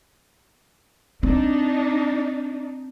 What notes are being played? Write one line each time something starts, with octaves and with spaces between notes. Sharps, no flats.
C4 D4 D#4